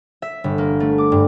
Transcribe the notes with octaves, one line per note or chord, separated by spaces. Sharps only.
E5
G1
A#3
A3
D6
G2